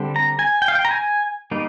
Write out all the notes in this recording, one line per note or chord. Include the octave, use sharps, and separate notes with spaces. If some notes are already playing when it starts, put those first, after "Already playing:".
Already playing: D3 G3 C4
A#5
G#5
G5
F5
G5
A#5
G#5
G3 A#3 D#4